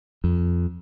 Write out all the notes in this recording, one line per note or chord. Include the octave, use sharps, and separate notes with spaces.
F2